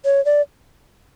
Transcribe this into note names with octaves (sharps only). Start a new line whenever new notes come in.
C#5
D5